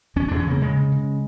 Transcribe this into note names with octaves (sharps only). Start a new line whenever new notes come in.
E2 C#4
E2 D4
C#4
C#3 A#3
C#3 G#3
C#3
C#3